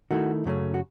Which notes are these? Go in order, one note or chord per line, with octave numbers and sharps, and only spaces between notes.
D#3 A3 E4 F#4
F#2 C#3 F#3 A3 C#4
F#4